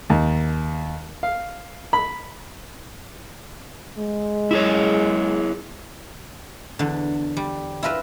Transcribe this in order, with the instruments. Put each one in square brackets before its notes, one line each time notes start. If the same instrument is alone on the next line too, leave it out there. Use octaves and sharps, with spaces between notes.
[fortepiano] D#2
F5
B5
[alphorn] G#3
[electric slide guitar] E4 G#4 C#5
[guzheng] E2 D3
G3
E4 F4 A#4 B4 E5